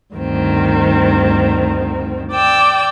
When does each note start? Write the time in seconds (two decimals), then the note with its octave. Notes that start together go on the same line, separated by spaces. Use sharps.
0.14 D2 G2 D#3 C4
2.31 D5 G5 E6